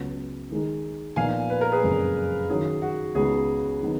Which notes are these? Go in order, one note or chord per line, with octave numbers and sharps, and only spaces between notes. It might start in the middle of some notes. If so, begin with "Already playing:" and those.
Already playing: C#2 C#3 F#3 B3
D#3 G#3 D#4 G#4
A#2 F3 B3 D#4 F5 G#5
B4
A#4
G#4 B4
F#1 F2 C#3 G#3
D#3 F#3 C#4 G#4
F#4
C#2 C#3 G#3 B3 D#4 G#4
D#3 F#3 B3 D#4